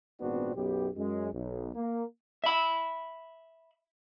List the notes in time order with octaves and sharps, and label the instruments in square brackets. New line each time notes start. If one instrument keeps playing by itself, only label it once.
[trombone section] G#1 A#2 B3 C4 D4 F#4
B1 F#2 B3 G4
F#2 G#3
B1
A#3
[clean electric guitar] E5 B5